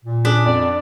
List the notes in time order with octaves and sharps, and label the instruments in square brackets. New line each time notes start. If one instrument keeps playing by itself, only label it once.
[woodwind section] A#2
[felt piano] C#4 G#4 B6 [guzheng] D4
[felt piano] F2 [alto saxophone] D5